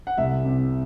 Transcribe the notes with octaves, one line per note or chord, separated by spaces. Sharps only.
F#5
C2 E5
C3